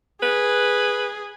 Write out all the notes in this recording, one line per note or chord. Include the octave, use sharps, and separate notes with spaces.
G#4 B4